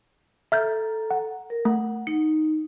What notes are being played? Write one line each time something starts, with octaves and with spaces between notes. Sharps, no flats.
A4 E5 A#5 F6 G6
F#5
A#4
A3 F#5
D#4 C#7